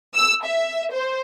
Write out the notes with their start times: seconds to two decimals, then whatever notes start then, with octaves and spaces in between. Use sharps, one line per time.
0.15 E6
0.45 E5
0.93 C5